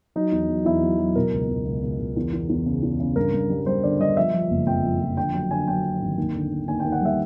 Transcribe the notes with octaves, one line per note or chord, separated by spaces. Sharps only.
F#3 D#4
E2
F#3
E2 E4
F#3
F#3
B2 A#4
C#2
C#2
C#2
C#2
C#2
E2
E2
E2
C#3
E2
C#3
G2 A#4
G2
G3
G3 C5
D3 D5
G3 D#5
F3 E5
F3
F#1
F2 G5
F3
F3
D3 G5
F#3 G5
D3 G#5
F#3 G5
F#3
G#1
D#2
D3
D#2
D#2 G#5
D#2 G5
F#5
G3 E5